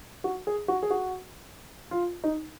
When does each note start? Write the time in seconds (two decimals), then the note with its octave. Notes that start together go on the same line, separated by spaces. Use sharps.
0.24 F#4
0.47 G#4
0.68 F#4
0.83 G#4
0.90 F#4
1.91 F4
2.24 D#4